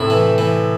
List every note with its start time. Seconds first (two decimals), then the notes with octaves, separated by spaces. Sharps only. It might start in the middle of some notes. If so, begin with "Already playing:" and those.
Already playing: A2 C3 E4
0.10 E3
0.38 E3